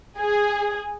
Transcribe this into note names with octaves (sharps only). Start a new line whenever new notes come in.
G#4